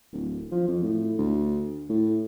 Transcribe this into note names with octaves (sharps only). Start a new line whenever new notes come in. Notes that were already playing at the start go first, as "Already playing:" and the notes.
D1
F3
F2
A2
D2
A2